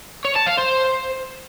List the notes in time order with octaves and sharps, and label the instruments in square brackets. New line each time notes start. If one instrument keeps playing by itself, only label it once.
[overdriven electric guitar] C#5
A5
F5
C5